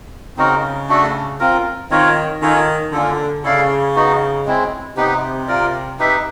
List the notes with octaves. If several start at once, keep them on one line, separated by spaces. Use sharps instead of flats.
C#3 C4 D#4 F#4 A#4
A3 D4 F#4 A4
C4 F4 A#4
D#3 C4 F4 A#4 C#5
D#3 C#4 F4 A4 C#5
D3 A#3 C#4 F4 A4
C#3 E4 A4 D5 F5
B3 D#4 F#4
G#3 C4 E4
C3 B3 D#4 G4 B4
F4 A#4 D5
D#4 G4 B4 E5